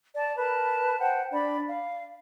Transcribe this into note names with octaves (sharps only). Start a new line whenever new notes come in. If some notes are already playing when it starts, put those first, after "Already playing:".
D5 A5
A#4 B4 A5 B5
C5 F#5 G5 A5
D4 D5 B5
F5